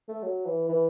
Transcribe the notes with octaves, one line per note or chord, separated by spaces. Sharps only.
A3
F#3
E3
E3